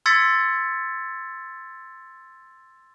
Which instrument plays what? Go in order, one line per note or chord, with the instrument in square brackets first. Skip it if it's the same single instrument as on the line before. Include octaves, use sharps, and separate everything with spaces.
[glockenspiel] C6 E6 G#6 A6 B6 C#7